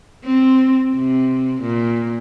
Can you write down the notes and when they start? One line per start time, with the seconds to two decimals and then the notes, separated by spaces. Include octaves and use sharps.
0.25 C4
0.95 C3
1.62 A#2